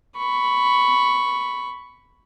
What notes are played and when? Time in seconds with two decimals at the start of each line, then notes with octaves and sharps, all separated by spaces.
0.17 B5 C#6